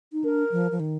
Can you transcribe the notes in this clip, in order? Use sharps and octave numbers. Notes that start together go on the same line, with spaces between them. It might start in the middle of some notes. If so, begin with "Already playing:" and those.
D#4
D4 A#4
F3
F3
D#3